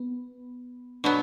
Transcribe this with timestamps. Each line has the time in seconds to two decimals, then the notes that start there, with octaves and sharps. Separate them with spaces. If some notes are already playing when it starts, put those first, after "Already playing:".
Already playing: B3
1.04 B2 F#3 B3 D4